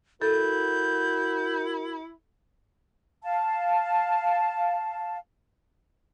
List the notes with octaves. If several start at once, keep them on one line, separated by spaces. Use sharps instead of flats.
E4 F#4 A4 A#4 G6
F5 A5